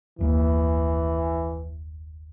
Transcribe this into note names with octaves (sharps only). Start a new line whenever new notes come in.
F#1 D#2 E3 A#3